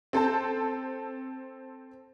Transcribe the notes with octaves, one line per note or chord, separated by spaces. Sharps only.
C4 A4 C5 A5